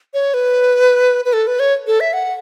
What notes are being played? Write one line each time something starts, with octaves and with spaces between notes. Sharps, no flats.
C#5
B4
B4
A4
B4
C#5
A4
E5
F#5